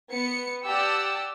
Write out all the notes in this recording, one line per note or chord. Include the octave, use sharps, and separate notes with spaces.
B3 C#7
G4 D5 F#5 A5 E6